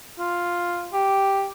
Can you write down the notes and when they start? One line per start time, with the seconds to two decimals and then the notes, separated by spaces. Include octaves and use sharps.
0.18 F4
0.93 G4